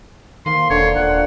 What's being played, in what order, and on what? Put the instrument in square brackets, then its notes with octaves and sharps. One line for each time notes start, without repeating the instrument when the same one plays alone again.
[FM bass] D#3 [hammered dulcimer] A#3 C5 [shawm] C6
[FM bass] E1 [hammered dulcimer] D3 [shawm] C#5
[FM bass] D#1 [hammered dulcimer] F4 G5 [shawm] F#5